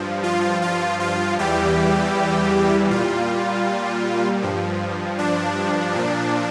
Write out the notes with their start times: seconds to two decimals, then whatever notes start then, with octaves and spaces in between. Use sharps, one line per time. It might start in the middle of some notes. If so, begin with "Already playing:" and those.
Already playing: G2 F3
0.23 F4
0.62 F4
1.00 F4
1.39 E2 E3 G3 G4
2.91 A#2 G3 F4
4.42 G2 F3
5.19 D4
5.95 A#2 F3